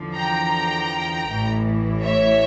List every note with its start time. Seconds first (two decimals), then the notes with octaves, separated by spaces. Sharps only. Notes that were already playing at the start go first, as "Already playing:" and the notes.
Already playing: E2 D3 F3
0.15 G5 A#5
1.28 A1 A2 E3
2.02 C#5 E5